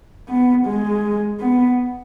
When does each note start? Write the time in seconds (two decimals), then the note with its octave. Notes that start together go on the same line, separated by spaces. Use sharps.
0.29 B3
0.66 G#3
1.40 B3